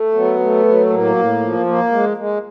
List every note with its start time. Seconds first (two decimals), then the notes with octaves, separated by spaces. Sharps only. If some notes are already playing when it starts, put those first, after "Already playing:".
Already playing: A3
0.14 F#3 B3
0.39 A3
0.65 F#3
0.90 A2 A#3
1.16 A2
1.41 F3
1.66 A#3
1.92 G#3
2.17 G#3